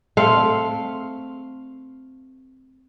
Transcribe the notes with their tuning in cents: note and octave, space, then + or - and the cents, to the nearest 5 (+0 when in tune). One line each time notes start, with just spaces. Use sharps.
A3 +0 C4 +0 F5 +0